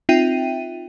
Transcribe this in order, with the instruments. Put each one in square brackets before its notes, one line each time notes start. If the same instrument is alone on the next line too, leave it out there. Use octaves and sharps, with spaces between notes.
[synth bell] C4 D#4 F4 E5 G5 D#7